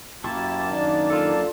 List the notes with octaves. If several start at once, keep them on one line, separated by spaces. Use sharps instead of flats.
F#2 A#3 E4 G4 A5 C#6
D#3 D4
F4 A4